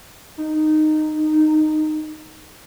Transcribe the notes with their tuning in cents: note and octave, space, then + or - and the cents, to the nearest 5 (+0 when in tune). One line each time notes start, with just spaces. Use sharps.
D#4 -15